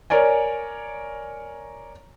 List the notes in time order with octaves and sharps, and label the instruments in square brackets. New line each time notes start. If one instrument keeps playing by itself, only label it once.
[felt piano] A#4 C#5 D5 G#5